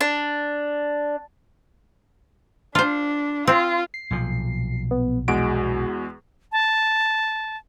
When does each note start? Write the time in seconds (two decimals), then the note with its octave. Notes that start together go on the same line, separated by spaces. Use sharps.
0.01 D4
2.75 D4 F4 C5
3.47 C4 F4
3.94 C7
4.11 B1 A#2 F3
4.91 B3
5.28 E2 G#3 F#4 D7
6.52 A5